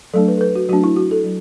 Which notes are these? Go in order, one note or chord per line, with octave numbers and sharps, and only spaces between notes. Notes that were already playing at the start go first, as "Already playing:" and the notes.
F#3 A3 D4 A4
B4
A4
B4
F#4
F#3 A3 D4 F#4
E4
F#4
A4
F#3